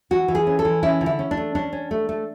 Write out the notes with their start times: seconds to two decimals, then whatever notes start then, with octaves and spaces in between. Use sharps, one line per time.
0.11 E3 F#4
0.28 E3
0.35 G#4
0.47 C#4
0.59 A4
0.65 E3
0.82 C#4 E4
1.01 D3
1.06 E4
1.19 C#4
1.31 D4
1.37 A3
1.55 C#4 D4
1.73 C#4
1.91 A3
2.09 A3